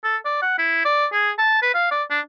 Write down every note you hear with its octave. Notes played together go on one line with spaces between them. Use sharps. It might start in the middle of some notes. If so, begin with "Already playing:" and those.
A4
D5
F#5
E4
D5
G#4
A5
B4
F5
D5
D4